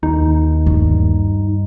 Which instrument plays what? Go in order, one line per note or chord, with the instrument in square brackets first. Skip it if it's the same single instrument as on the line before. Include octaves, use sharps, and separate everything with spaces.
[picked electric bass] D#2 [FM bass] D#4
[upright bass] G2